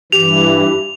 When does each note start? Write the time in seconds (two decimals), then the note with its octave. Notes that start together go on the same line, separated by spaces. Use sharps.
0.12 G2 E3 G4 F7